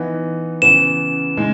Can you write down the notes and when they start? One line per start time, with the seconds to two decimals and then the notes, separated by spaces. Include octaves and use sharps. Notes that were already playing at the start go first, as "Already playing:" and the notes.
Already playing: E3 B3 D#4
0.62 C#3 E3 B3 E7
1.37 C#3 G#3 D#4